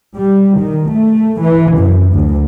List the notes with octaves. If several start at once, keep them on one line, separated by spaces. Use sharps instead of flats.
G3
D#3
A3
E3
F#2
D2